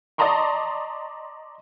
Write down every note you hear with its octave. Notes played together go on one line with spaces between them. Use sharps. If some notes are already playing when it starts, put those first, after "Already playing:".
D5 D#5 A5 A#5 C6 C#6